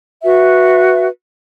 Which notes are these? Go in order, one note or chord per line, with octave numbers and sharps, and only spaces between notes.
F#4 B4 E5